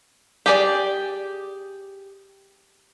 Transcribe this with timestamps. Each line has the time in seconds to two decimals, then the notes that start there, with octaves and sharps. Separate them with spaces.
0.46 G4 G#4 D5